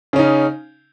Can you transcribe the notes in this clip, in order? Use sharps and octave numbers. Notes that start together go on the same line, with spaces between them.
C#3 C#4 D#4